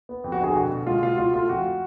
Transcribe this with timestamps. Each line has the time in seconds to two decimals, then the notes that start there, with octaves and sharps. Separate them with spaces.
0.09 B3
0.24 F2
0.32 F#4
0.39 D3 G#4
0.55 B2 F#4
0.71 B2 F#4
0.87 G#3 F4
1.03 B2 F4
1.18 B2 F4
1.33 A3 F4
1.49 F2 F#4